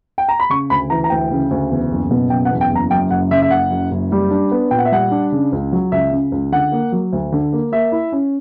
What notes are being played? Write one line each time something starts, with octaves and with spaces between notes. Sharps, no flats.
G5
A#5
B5
C#3 C#6
D2 B5
E3 A#5
A#5
D2 G5
C#3
D2
E2
F#1
B2
F#1 G5
F#5
E2
G5
F#1
A#5
F#2 G5
F#1 F#5
C#3 E5
E5
F#1 F#5
F#2
F#1
G3
D4
B3
A#2 G5
F#5
E5
G3 F#5
D4
C#3
C#2
F#3
C#2 E5
C#3
C#2
D3 F#5
A#3
F#3
D2
D3
A#3
A#3 E5
E4
C#4